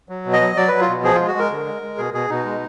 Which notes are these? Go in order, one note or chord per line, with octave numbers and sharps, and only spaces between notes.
F#3
B2
D#5
F#3
F#3 D5
F#3 B4
F4
B2
F3 G#4
F4
G#3
F#4
G#3 A#4
D3
G#3
G#3
B2 G#4
B2 G#4
B2 D#4
G#3